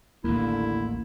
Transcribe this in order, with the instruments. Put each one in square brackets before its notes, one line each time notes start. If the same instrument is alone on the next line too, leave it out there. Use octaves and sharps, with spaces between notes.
[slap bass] A1 D#2 [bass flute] D3 [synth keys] A#3 [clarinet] E4